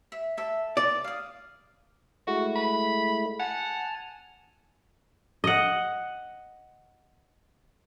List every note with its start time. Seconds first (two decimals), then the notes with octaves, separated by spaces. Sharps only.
0.12 E5
0.37 A4 E5
0.77 D5
1.04 F5 D#6
2.27 G#3 A3 E4 F#4
2.56 B5
3.40 F#5 G#5 A5 F6
5.44 D#5 F#5